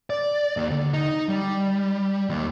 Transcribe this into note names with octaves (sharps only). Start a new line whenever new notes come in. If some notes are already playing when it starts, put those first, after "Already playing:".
D5
D#2
D3
D#4
G3
D#2